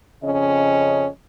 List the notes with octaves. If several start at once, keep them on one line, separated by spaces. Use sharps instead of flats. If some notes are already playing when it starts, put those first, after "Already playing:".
F2 C#3 C#4 D#5